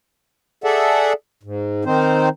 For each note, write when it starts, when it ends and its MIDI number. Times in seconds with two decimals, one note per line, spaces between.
0.64 1.13 68
0.64 1.13 69
0.64 1.13 74
0.64 1.13 76
0.64 1.13 78
1.43 1.84 44
1.85 2.29 51
1.85 2.29 60
1.85 2.29 63
1.85 2.29 72